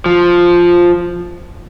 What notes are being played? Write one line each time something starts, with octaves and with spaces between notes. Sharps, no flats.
F3